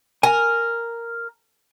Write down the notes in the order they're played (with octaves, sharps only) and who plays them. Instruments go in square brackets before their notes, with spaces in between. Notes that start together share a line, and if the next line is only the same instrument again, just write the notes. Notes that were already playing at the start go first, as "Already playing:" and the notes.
[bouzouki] A#4 [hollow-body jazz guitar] G#5